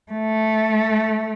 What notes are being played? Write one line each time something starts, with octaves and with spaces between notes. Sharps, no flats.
A3